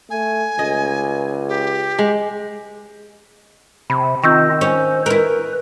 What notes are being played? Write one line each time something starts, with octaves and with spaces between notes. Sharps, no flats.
A3 G#5
C#2 D#5
G4
G#3
C3 B5
D#3 C4 F4 D#5 C#6 E6 G6
C#4 C5
E4 A#4 B4